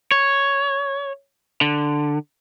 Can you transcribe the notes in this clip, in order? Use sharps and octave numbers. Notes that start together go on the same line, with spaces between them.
C#5
D3